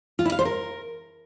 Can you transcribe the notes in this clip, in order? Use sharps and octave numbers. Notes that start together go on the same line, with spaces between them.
F4
E4
F5
C5
A#4